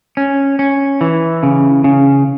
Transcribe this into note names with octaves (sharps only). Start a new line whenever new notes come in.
C#4
C#4
E3
C#3
C#3